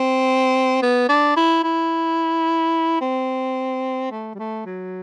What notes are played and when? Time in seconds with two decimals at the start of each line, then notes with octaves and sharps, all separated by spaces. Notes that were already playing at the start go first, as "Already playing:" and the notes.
Already playing: C4
0.82 B3
1.09 D4
1.37 E4
1.64 E4
3.01 C4
4.11 A3
4.35 G3
4.39 A3
4.66 F#3